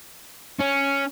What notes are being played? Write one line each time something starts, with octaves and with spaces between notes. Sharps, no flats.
C#4